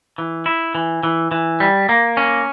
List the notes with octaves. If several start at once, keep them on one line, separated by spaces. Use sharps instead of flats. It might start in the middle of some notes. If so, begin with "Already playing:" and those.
E3
E4
E3
E3
E3
G3
A#3
C#4